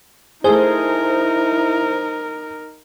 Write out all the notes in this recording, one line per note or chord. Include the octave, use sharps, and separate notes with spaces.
A3 D#4 E4 G#4 A#4 C5